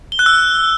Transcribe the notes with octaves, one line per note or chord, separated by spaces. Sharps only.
G7
F#6
E6